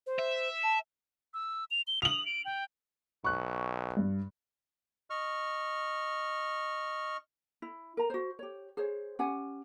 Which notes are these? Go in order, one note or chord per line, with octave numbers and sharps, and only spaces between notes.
C5
E5
A5
E6
F7
G7
D#6 F7 F#7
D7
G5
B1 C#6 F#6
G2
D#5 C#6 F6
E4
A#4 A#5
F#4 C5
G4 C#5
G#4 C5 C#5
C#4 G4 F#5 G#5